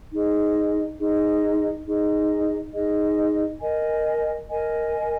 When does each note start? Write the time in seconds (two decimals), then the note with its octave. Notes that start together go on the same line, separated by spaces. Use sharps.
0.12 D#4 G#4 D#5
0.99 D#4 G#4 D#5
1.86 D#4 G#4 D#5
2.74 D#4 G#4 D#5
3.61 A#4 D#5 G#5
4.48 A#4 D#5 G#5